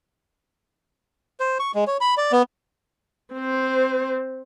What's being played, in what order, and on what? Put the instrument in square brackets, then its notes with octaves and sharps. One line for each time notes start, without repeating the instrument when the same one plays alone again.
[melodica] C5
C#6
G#3
C#5
B5
D5
B3
[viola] C4 C5